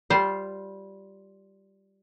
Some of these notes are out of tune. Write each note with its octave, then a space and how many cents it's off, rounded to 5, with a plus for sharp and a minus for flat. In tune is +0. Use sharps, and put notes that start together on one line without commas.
G3 -10 F4 +0 C5 +0